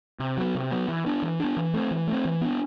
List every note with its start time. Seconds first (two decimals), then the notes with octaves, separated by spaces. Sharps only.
0.20 C3
0.37 F#3 B3
0.55 C3
0.71 F#3 B3
0.88 E3
1.06 B3 D4
1.22 E3
1.40 B3 D4
1.57 E3
1.74 A3 C4
1.91 E3
2.08 A3 C4
2.25 E3
2.41 B3 D4